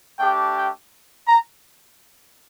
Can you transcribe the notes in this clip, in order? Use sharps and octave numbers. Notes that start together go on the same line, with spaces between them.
A3 D4 G4 G5
G5
A#5